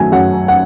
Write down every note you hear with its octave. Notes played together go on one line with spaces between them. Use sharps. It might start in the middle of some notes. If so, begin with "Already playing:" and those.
Already playing: D#3 F#3 A3 G#5
F#2 F#5
F#5